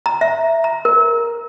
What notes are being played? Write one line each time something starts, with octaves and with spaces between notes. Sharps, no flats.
A#5
E5
A#5
A#4